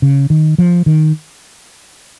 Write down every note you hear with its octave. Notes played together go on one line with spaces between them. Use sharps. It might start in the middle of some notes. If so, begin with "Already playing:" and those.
C#3
D#3
F3
D#3